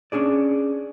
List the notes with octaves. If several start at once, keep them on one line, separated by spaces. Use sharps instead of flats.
C#4 D4 G#4 D5